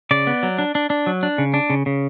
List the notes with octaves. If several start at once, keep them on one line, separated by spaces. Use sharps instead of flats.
C#3 D5
B3
F#3
D4
D4
D4
F#3
D4
C#3
D4
C#3
C#3